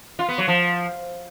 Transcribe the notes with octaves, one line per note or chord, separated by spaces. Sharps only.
F4
B3
F#3
F3